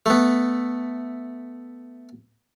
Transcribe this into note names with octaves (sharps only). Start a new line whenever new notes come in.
A3 B3